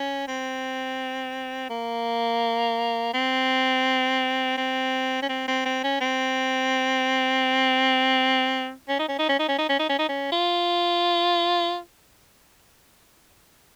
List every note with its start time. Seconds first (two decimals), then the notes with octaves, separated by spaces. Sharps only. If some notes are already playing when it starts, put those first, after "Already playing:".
Already playing: C#4
0.28 C4
1.70 A#3
3.14 C4
4.58 C4
5.23 C#4
5.29 C4
5.48 C4
5.66 C4
5.84 C#4
6.01 C4
8.89 C#4
8.99 D#4
9.09 C#4
9.19 D#4
9.29 C#4
9.40 D#4
9.49 C#4
9.59 D#4
9.69 C#4
9.80 D#4
9.90 C#4
9.99 D#4
10.09 C#4
10.32 F4